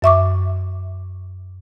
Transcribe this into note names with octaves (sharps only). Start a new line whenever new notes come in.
F#2 E5 C#6 D6